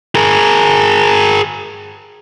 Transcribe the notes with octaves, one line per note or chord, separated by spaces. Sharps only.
G#4 A#4